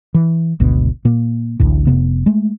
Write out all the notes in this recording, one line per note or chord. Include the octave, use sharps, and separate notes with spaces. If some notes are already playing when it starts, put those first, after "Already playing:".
E3
G#1 D2 B2
A#2 A#3
A1 D2 A2
F1 F2 C3 B3
G#3 A3